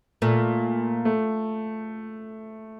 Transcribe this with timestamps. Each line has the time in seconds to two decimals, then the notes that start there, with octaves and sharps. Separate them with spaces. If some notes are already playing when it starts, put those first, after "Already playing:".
0.22 A#2 A3
1.05 A3